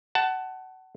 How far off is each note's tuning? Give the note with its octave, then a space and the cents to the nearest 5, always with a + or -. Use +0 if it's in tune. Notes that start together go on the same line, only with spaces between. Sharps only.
F#5 +20 A5 +0